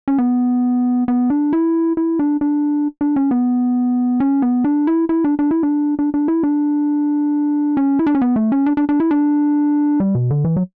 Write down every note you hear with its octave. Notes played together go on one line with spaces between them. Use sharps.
C#4
B3
B3
D4
E4
E4
D4
D4
D4
C#4
B3
C#4
B3
D4
E4
E4
D4
D4
E4
D4
D4
D4
E4
D4
C#4
E4
D4
C#4
B3
A3
C#4
D4
D4
D4
E4
D4
G3
B2
D3
E3
F#3